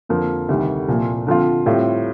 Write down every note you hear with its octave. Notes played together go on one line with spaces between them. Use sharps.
F2 D3 F3 A#3
D2 C3 D#3 G3
C2 A#2 F3
D3 F3 C4 F4
A2 G3 C4 F4